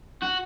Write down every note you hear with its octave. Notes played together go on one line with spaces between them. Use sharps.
F#4